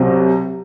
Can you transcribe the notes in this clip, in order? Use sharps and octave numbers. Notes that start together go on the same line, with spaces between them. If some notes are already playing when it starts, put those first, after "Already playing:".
Already playing: C2 C3 F#3 C4